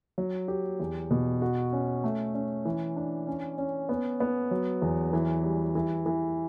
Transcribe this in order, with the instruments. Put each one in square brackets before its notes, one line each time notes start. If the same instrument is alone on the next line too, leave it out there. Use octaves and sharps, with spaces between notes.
[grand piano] F#3
G4
E2
B2
F#4
C#4
A3
C#4
E3
D4
C#4
C#4
B3
B3
F#3
E2
E3
G3
E3
E3